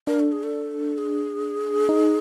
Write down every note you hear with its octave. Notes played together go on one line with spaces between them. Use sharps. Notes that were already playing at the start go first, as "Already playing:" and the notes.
D4 A#4
A4
G#4
A4
G#4
D#4